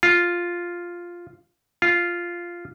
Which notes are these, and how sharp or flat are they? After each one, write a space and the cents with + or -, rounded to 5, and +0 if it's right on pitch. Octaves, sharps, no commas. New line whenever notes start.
F4 +0
F4 -5